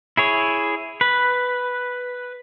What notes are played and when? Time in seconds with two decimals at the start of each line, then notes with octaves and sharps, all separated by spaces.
0.17 E4 G#4 C#5
1.01 B4